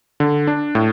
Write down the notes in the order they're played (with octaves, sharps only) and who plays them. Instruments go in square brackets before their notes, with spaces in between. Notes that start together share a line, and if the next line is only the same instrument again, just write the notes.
[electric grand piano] D3
D4
A2